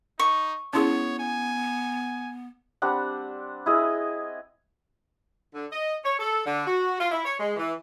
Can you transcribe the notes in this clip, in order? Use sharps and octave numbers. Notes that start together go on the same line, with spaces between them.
D#4 C#6
B3 C#4 E4 G#4 C#5
G#5
G3 C4 D4 F#5
E4 G#4 D#5
D3
D#5
C#5
A4
D3
F#4
F4
E4
C#5
G#3
E3